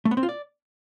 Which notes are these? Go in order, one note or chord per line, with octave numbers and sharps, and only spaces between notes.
A3
B3
C4
F4
D5